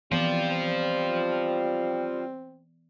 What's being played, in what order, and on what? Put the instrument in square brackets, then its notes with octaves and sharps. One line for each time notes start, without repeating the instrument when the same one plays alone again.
[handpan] E3 B3 D5 [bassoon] G3 [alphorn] C4 [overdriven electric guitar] F4 C5